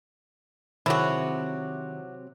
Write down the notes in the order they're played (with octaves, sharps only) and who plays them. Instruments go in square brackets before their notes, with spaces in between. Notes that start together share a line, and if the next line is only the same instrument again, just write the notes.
[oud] C3 F#3 G#4 [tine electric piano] D#3 [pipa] E4 F#4